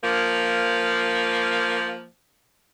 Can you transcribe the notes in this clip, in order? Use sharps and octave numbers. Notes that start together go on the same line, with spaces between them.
F3 A#3